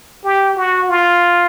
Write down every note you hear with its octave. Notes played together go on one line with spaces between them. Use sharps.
G4
F#4
F4